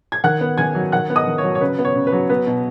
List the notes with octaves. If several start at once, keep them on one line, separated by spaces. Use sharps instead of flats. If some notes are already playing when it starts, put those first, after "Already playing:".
G#6
D#3 F#5 F#6
B3
D#3 G#5 G#6
F#3
D#3 F#5 F#6
B3
D#5 D#6
D#3
C#5
F#3
C#5
C#3 B4
B3
C#5
C#3
B4
F#3
B3 B4
B2